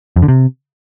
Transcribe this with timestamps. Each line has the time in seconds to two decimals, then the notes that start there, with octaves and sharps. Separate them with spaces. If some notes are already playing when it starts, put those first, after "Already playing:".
0.16 F2
0.22 D3
0.28 C3